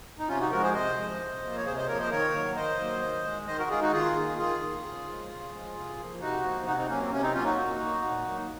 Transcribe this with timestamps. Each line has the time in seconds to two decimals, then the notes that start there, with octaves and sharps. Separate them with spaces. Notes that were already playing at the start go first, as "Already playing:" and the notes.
0.19 D#4
0.29 C3 C#4 F4
0.40 D#4 F#4
0.51 F3 G#3 F#4 A#4
0.62 G#4 C5
0.74 C3 C5 D#5
0.98 F3 G#3
1.20 C3
1.43 F3 A#3
1.56 C#5
1.65 C3 G#4 C5
1.77 C5 D#5
1.88 F3 A#3 A#4 C#5
1.99 C5 D#5
2.11 D#3 A#4 C#5
2.34 F#3 A#3
2.56 D#3 C5 D#5
2.79 F#3 A#3
3.02 D#3
3.25 G#3
3.47 D#3 C5 D#5
3.58 F#4 A#4
3.70 G#3 F4 G#4
3.81 D#4 F#4
3.93 D#3 F4 G#4
4.15 A#3
4.38 D#3 F4 G#4
4.61 A#3
4.84 C#3
5.06 F3 G#3
5.29 C#3
5.52 F3 G#3
5.75 C3
5.97 F3 A#3
6.20 C3 D#4 F#4
6.43 F3 A#3
6.66 C3 D#4 F#4
6.77 C4 D#4
6.88 F#3 A#3 C#4
7.00 C4
7.11 C3 C#4
7.23 C4 D#4
7.34 F#3 A#3 C#4 F4
7.45 D#4 F#4
7.57 A#2
7.80 F#3 A#3
8.02 A#2
8.24 F#3 A#3